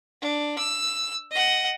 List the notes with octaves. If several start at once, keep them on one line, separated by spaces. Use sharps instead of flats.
D4
E6
D#5 F#5